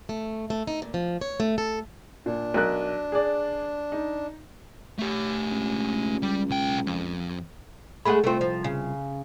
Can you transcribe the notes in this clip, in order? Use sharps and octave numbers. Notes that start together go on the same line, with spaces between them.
A3
A3
D#4
A#2
F3
C#5
A3
A4
A#2 D4
B1 A#4 F#6
G#4 D5
D#4
A3 G4
C#2
G3
B1 G5
F2
G#3 A3 G#4 F#5 B5
C2 A3 C4 F4
F3
C#3